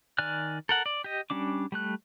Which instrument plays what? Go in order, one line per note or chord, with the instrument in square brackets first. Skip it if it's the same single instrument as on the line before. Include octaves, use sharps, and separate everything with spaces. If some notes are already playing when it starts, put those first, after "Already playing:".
[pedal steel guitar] D#3 D5 G#5 F6 F#6
A4 A#4 F#5
D5
G4 D#5
G3 C#4 D4 D6
G3 A3 F#6